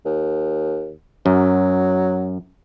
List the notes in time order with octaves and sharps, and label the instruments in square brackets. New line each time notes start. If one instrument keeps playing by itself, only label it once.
[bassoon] D#2
[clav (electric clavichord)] F#2 [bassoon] F#3